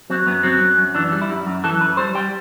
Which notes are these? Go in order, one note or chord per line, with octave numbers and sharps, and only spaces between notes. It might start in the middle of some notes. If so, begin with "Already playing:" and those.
F#3 C4
F#2 B3
F#3 C4
F#2
F#2
E3 D4
G3
E4
F#2
F#2
E3 A4
F#2 B4
G3 C5
G3 G5